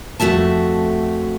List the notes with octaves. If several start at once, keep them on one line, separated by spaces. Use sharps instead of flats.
F2 A3 F#4 E5 A5